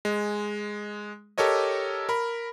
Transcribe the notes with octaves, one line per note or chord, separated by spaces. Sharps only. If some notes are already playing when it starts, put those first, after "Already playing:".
G#3
G4 A4 A#4 C#5 D#5
A#4 B5